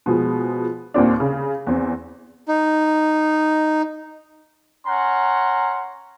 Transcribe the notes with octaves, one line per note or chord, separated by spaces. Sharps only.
B2 F3 G#3
D#2 A#2 C4 D4
C#3
E2 C4
D#4
C#4 F#5 A#5 C6